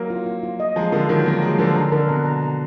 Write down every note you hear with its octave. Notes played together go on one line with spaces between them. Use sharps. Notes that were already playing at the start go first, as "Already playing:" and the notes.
Already playing: F#3 A#3 A#4
F4
F4
F4
D#5
F3 G#3 A#5
D3 F3 A#4
D#3 F#3 A#4
F#3 A#3 A#4
F3 G#3 A#5
D3 F3 A#4
D3 A#5
D3 A#4
B2 A#5
A#5
A#5